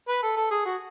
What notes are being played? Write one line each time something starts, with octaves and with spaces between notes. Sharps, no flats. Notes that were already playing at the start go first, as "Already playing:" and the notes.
B4
A4
A4
G#4
F#4